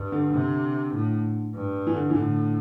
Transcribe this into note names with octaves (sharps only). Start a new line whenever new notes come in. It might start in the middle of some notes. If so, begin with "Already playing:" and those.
Already playing: G2
D3
C3
A2
G2
E3
D3
E3
A2 D3